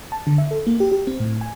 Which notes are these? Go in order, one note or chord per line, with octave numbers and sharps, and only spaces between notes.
A5
D3
E5
A4
A#3
G4
G4
C4
A2
G#5